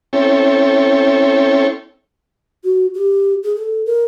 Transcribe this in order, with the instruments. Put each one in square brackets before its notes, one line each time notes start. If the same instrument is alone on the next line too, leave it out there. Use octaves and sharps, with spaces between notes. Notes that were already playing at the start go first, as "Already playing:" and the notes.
[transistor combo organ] C4 C#4 E4 A4 C#5 G5
[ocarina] F#4
G4
G#4
A4
A#4